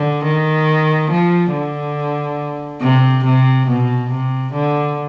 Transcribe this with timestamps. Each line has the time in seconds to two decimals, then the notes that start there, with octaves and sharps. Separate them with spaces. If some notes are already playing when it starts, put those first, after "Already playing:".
Already playing: D3
0.24 D#3
1.10 F3
1.53 D3
2.81 C3
3.24 C3
3.68 B2
4.10 C3
4.53 D3